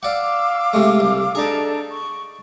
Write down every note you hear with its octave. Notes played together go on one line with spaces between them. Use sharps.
D5 F5 F#5 D6 E6
C3 G#3 A3
C2
D4 D#4 G#4 A4 A#5
C#6